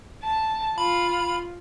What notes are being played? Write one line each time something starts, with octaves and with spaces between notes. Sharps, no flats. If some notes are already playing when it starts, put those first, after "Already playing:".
A5
F4 B5